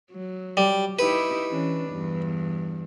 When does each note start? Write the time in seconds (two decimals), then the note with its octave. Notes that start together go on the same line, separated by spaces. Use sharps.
0.12 F#3
0.57 G3
0.99 D#4 E4 G4 B4
1.49 E3 C#4 D4
1.88 E2 G2